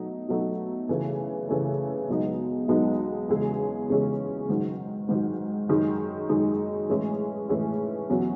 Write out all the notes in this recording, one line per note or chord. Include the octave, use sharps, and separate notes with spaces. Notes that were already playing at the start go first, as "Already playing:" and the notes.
Already playing: B2 F#3 A3 D#4
B2 F#3 A3 D#4
C#3 E3 A3
C#3 E3 A3
B1 B2 G#3 B3 D#4
B1 B2 G#3 B3 D#4
E2 C#3 G#3 C#4 G#4
E2 C#3 G#3 C#4 G#4
G#2 D#3 F#3
G#2 D#3 F#3
F#2 D#3 G#3 D#4 G#4
F#2 D#3 G#3 D#4 G#4
A2 E3 G#3 C#4 G#4
A2 E3 G#3 C#4 G#4
E2 B2 F#3 C#4